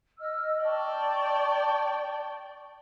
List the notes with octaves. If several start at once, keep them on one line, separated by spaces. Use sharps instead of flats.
D#5 E6 F6
D5 G5 A5 C#6